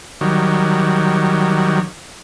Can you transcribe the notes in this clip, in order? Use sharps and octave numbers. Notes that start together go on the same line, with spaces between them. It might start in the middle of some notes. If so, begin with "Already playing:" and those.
D#3 F#3 G3